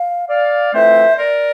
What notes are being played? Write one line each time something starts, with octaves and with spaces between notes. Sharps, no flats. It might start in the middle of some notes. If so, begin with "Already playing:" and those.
Already playing: F5
D5 F5
F2 E3 A3 C4 C5 E5
A#4 D5